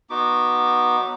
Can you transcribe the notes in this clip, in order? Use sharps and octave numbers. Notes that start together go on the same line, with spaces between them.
B3 D#4 F#4 D6
F#3 B3 D#4